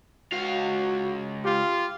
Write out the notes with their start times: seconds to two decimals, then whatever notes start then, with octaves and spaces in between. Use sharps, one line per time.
0.33 C#2 F#4 F5
1.45 F4 G4